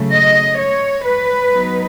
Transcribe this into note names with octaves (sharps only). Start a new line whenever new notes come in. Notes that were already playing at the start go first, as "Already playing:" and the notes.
Already playing: C#3 F#3 A3
D#5
C#5
B4
F#3 B3 D#4